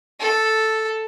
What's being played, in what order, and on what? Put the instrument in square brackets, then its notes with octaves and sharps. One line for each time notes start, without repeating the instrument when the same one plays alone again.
[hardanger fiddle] A4